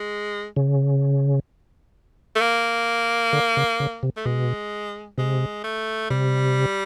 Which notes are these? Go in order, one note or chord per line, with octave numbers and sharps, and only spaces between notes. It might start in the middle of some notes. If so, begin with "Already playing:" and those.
Already playing: G#3
C#3
A3
A#3
D3
C#3
C#3
C3
A3
B2 G#3
C3 G#3
A3
C3 G3